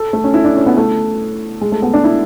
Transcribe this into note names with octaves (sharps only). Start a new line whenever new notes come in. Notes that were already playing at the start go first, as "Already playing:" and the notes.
Already playing: A4
A3
C#4
E4
D4
C#4
B3
A3
G#3
A3
B3
D4
E4